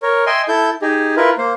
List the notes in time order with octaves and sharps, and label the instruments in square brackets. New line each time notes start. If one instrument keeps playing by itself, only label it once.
[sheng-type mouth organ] A#4 C#5
D#5 E5 G5 G#5 C6
E4 A4 G6
D#4 G4 G#4
E4 F4 A#4 B4
A#3 C5